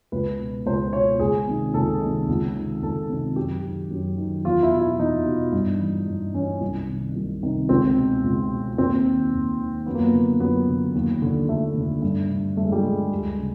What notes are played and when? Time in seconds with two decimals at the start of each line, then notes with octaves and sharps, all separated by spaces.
0.12 C#2 B4
0.39 B2
0.66 C#2 C5
0.93 B2 C#5
1.20 C#2 G#4
1.47 C3 D#3
1.74 C#2 A4
2.01 C3 D#3
2.28 C#2
2.56 C3 D#3
2.83 C#2 A4
3.09 C3 D#3
3.36 F#2 G4
3.64 D#3
3.91 F#2
4.18 D#3
4.45 E2 F4
4.63 E4
4.72 B2
4.81 E4
4.99 E2 D#4
5.26 B2
5.53 G2
5.80 E3
6.08 G2
6.34 E3 C#4
6.61 C2
6.88 C3 D#3
7.16 C2
7.43 C3 D#3
7.69 C#2 C4
7.97 B2
8.24 C#2
8.51 B2
8.78 D#2 C4
9.05 D#3
9.33 D#2
9.60 D#3
9.86 F#2 B3
9.94 A#3
10.03 B3
10.13 D3
10.40 F#2 B3
10.68 D3
10.95 D#2
11.22 D3
11.49 D#2 A3
11.76 D3
12.02 G2
12.30 D3
12.57 G2 A3
12.65 G#3
12.72 G3
12.80 D3 G#3
13.12 D2
13.38 C#3